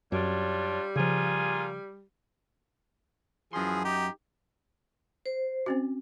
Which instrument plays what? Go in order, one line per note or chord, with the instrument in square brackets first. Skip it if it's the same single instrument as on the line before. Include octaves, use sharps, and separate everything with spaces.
[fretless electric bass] F#2 [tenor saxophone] G3 [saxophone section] D4 F4 C#5
[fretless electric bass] C#3 F3 [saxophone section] A#3 F4 G#4
[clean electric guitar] F#2 C6 [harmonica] E3 F3 G#4
[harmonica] D#4 G4
[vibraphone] C5
[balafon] C4 C#4 F#4